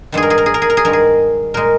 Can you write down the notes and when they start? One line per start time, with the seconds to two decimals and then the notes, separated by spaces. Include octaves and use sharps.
0.12 G2 D#3 G#3 G#4
0.23 A#4
0.30 G#4
0.38 A#4
0.46 G#4
0.54 A#4
0.62 G#4
0.70 A#4
0.77 G#4
0.85 G2 D#3 G#3 A#4
0.93 G#4
1.54 A#2 G#3 A#4